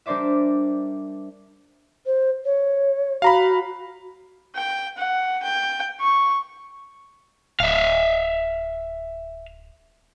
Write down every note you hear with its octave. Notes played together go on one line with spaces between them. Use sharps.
G3 D4 A#4 C5 D5 E5
C5
C#5
F#4 F5 A#5 B5
G5
F#5
G5
C#6
D1 E5 F5